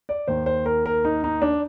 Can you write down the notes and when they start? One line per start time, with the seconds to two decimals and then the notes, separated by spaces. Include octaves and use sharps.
0.09 D5
0.28 D#2 D#3 C5
0.46 C5
0.66 A#4
0.86 A#4
1.05 D#4
1.24 D#4
1.42 D4